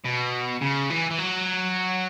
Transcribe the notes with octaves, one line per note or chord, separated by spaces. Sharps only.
B2
C#3
E3
E3
F#3